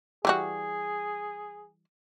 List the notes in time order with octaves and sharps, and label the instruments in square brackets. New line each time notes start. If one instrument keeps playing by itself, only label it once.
[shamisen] E3 G3 F#4 [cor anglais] G#4